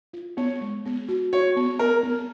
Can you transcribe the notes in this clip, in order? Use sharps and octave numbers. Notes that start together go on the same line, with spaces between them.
F4
B3 C#5
G#3
B3
F#4
F#4 C#5
B3
B3 A#4
B3